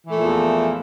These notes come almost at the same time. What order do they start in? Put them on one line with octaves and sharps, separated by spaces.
E3 A3 A#2 F3 E2